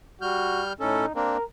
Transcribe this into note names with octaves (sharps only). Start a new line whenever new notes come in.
G3 F#4 F6 G6
A2 C#4 D#4 A4
A#3 C4 D4 A#4